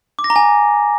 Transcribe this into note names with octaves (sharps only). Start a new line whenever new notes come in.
D6
A#6
A#5
G#5